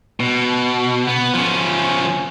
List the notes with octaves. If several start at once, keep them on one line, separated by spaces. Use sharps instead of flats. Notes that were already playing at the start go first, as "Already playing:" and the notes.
B2
B3
F3 C#4